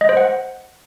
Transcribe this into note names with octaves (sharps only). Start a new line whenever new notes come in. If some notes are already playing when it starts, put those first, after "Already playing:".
D#5
C5
F#5